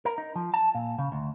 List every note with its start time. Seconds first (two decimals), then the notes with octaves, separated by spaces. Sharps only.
0.05 A#4
0.18 D#4
0.36 F3
0.54 A5
0.75 A#2
0.99 C#3
1.12 D2